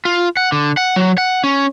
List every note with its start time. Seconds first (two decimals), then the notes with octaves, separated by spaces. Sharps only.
0.05 F4
0.37 F#5
0.52 D3
0.77 F#5
0.96 F#3
1.18 F#5
1.44 C#4